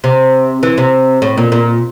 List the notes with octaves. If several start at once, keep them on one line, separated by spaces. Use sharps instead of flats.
C3
E3
C3
A2
A#2
A#2